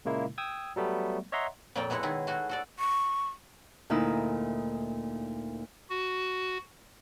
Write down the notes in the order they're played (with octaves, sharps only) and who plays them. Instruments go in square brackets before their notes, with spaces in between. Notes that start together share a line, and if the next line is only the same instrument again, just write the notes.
[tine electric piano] A#2 C#3 G#3 A#3 E4
G5 D#6 E6 G#6
F#3 G3 A3 B3
C#5 D#5 E5 F#5 A#5 C6
[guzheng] F2 A#2 A#3 C#5 D5 G5
B2 G#3 E4 C#5 F#5
D#3 E4 G#4
A3 F#4 G#4
F#4 A4 D5
[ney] C#6
[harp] D2 A#2 D#4 E4 E6
[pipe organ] F#4